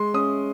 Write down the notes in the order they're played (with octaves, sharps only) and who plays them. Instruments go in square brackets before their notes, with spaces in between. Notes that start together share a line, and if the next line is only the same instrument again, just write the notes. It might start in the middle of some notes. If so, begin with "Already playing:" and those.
Already playing: [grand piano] G#3 C6
C#4 D#6